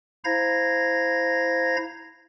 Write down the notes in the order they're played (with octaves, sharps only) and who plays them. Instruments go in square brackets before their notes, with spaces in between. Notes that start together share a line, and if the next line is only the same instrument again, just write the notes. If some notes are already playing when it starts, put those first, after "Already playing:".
[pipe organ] E4 C5 F5 A#5 G#6 A#6